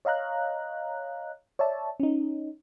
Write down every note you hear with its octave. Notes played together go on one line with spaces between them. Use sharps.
C#5 D#5 F5 A#5 F#6
C#5 D5 E5 A5
C#4 D#4